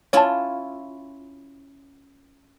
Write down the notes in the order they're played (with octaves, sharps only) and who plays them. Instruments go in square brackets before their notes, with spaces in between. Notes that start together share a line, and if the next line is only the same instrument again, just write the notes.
[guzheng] C#4 E4 F4 [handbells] C#5 A5